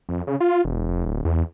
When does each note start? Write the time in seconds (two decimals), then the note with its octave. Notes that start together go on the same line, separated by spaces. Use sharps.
0.09 F2
0.27 C#3
0.40 F4
0.65 E1
0.88 F1
1.06 D1
1.25 E2